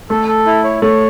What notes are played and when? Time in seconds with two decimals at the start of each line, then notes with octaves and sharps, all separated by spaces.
0.10 A3 A4
0.28 A4
0.46 E4
0.64 C#5
0.82 A3 C#5